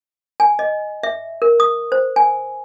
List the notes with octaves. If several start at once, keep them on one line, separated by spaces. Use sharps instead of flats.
G#5
D#5
E5
A#4
D#6
C5
G#5